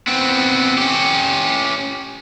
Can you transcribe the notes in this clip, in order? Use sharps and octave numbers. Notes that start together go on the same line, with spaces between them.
B3 C4
C#4 G4